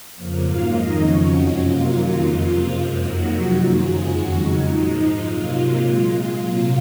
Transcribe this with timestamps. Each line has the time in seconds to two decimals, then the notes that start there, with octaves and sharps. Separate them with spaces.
0.15 F2 C#3 F3 A#3
0.42 G#2 F#3 A#3 F4 F5
0.71 F2 D#3 G#3 D#4 D#5
0.99 F2 C#3 F3 C#4 C#5
1.28 F#2 F3 F#3 G#3 F#4
1.55 C3 F#3 A#3 F4
1.83 F#2 D#3 F#3 A#3
2.12 F2 C#3 G#3
2.39 C3 F3 A#3
2.68 F#2 F3 G#3
2.96 F2 D#3 F#3 A#3 F#4
3.25 C3 F3 G#3
3.53 F#2 D#3 A#3 F4
3.81 F#2 C#3 F3 G#3 G#4
4.09 F2 D#3 F#3 G#3 F#4
4.37 F2 C#3 G#3 D#4
4.65 A#2 F3 G#3 D#4
4.93 G#2 F3 G#3
5.22 C3 F#3 A#3 F4
5.50 C3 F#3 A#3
5.79 A#2 G#3
6.06 A#2 G#3 F4
6.35 C3 F#3 A#3